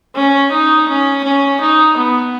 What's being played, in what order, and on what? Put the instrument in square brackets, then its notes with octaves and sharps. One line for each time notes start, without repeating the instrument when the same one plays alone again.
[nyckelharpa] C#4
D#4
C#4
C#4
D#4
B3